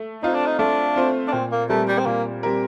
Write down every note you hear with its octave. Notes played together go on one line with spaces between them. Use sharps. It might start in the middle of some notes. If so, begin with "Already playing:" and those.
Already playing: A3
C4 D#4 F4 C5
D4
D#4
A3 D4
C4 F4 C5
D4
A#2 C4
A#3
G3 A3 C4 G4 A#4
G3
C4
A#2 A#3
G3 C4 G4 A#4